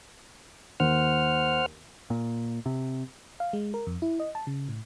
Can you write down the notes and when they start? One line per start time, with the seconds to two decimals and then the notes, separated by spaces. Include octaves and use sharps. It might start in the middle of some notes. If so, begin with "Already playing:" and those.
0.80 D#2 C5 F#5 F6
2.10 A#2
2.66 C3
3.40 F5
3.53 G#3
3.74 A#4
3.87 F2
4.02 E4
4.20 D#5
4.35 A5
4.47 C#3
4.69 A2